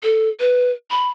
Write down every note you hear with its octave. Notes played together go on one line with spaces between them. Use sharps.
A4
B4
B5